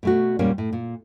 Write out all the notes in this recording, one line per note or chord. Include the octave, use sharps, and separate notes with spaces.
B2 A3 F#4
E2 A#2 G3 A#3 C#4
A2
A#2